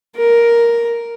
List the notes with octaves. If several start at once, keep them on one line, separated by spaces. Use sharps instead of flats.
A#4